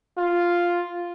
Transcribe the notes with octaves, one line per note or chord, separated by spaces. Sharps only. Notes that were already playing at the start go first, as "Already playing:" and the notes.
F4